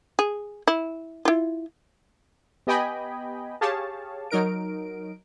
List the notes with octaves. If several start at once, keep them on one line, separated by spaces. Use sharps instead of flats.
G#4
E4
E4 F4
B3 G4 D#5 G5 G#5 B5
G4 G#4 C#5 F5 A5
F#3 D#4 A#4 D7